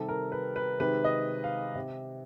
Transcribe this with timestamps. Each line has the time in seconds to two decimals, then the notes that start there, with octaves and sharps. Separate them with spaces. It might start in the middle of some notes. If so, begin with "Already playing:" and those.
Already playing: C3 D#3 G3 A4
0.09 A#4
0.32 B4
0.56 B4
0.80 C3 D#3 G#3 B4
1.04 D#5
1.44 F5
1.75 C3